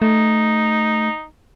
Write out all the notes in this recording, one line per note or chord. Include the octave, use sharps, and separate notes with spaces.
A3 D#4